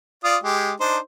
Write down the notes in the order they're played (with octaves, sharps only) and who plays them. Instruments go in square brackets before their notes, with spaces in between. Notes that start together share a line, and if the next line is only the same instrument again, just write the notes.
[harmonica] F4 D5 D#6
G#3 G4
D4 D#4 C5